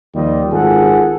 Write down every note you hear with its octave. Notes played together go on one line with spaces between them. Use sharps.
D#2 F3 G3 F4 D#5
G#1 F4 G#4 A4 F#5